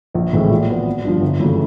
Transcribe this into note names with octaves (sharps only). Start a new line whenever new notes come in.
A#1
A2 E3 G#3 C4
A#2
F#3 B3
G#1
G2 D3 F3
G1
F#2 C#3 E3 A3